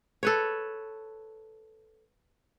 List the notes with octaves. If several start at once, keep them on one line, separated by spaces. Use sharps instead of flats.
A4 B4 C#5